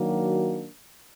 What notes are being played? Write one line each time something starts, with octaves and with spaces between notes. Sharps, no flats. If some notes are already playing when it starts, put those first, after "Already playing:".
Already playing: D#3 F#3 A#3 D4 F#4